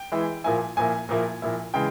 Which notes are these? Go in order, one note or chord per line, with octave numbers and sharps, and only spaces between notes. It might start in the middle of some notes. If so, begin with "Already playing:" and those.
Already playing: G5
E3 G#3 E4
A#2 F3 A#3 E4 G#5
A#2 F3 A#3 E4 G#5
A#2 F3 A#3 E4
A#2 F3 A#3 E4
C#3 E3 G#3 G5